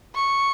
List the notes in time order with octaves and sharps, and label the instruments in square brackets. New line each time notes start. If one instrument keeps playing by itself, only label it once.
[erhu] C#6